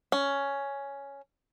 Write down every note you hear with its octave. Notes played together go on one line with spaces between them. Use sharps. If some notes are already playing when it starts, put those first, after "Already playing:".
C#4